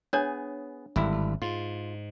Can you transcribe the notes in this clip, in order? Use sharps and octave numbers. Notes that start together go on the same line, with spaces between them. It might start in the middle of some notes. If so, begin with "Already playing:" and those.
B3 D4 G#4 C#5 G#5
G#1 G2 D3 E4
G#2 F4